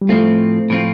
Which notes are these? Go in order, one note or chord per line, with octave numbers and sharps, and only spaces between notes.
G3
A2 F3 A3 C4 F4
A2 F3 C4 F4